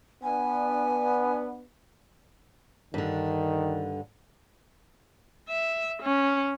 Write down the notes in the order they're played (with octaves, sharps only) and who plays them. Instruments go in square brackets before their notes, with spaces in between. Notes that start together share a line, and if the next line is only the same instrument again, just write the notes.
[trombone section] B3 D4 [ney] G#5
[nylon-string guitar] G2 D3 [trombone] D#3
[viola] E5
C#4